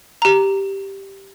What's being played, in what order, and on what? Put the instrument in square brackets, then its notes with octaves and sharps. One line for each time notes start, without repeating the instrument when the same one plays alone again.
[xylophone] G4 A#5